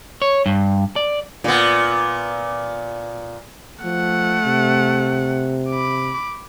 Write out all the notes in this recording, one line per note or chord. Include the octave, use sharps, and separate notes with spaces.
C#5
G2
D5
A#2 B3
F3 A3 F#5
C3
B5 D6